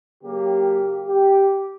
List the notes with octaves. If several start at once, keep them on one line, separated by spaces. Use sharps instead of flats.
C#3 F#3 A#3 G4
G4